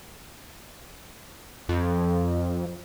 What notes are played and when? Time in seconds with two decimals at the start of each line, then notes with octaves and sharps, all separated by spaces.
1.69 F2